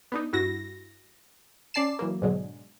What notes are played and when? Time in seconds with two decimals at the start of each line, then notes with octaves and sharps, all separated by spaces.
0.12 B3 D4 D#4
0.33 G2 E4 F#4 A#6
1.74 C#4 D5 A5 C7 E7
1.99 E3 F#3 A#3
2.22 G#2 B2 D3 F#3 G#3